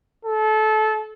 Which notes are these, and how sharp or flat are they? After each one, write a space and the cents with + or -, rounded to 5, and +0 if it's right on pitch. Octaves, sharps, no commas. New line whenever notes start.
A4 -25